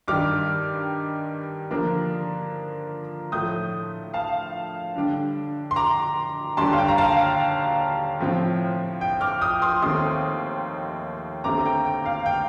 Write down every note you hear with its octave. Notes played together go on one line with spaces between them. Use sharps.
G2 D#3 G3 D6 F6
D3 F3 A#3 D4 F4
A2 F3 A3 D#6 G6
F5 A5
D3 G3 D4
C6
A#5 D6
D#2 D3 G3 A5 C6
F5
G5
A#5
F5 A5
G5
A2 F3 C4 F4
G5
D6 F6
D#6 G6
C6 D#6
D#2 D#3 A3 C4 C6 D#6
D#2 D3 A3 C4 A#5 D6
G5 A#5
G5
F5
G5